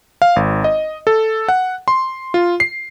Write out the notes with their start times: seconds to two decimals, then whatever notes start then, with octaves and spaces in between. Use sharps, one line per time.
0.22 F5
0.36 G#1
0.64 D#5
1.07 A4
1.48 F#5
1.88 C6
2.34 F4
2.60 C7